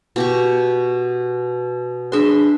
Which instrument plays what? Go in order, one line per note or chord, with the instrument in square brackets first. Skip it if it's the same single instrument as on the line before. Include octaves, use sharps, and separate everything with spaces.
[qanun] B2 G4 C#6
[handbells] D4 G#4 B4 [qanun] E5 C6